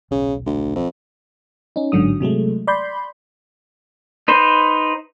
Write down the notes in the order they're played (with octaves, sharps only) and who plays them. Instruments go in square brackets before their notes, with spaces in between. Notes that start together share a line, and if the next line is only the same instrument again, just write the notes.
[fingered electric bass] D#1 B1 [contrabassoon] C#3
[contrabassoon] D2
F2
[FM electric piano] C#4 D#4
A1 G#2 D3 F#3 D#6
C3 F#3 G#3 A3
D5 B5 C6 G6
[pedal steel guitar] D#4 B4 C5